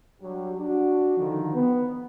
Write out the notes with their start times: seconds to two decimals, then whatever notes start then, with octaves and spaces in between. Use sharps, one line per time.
0.22 F#3 G3 D4 G4
0.58 D4 F#4
1.17 D3 D#3 F3
1.54 B3